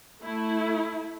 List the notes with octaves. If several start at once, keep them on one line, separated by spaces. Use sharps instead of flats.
A3 E4